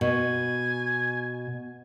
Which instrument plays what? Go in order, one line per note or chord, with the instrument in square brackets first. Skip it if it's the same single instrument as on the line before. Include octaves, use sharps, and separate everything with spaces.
[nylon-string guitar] B2 [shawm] G#5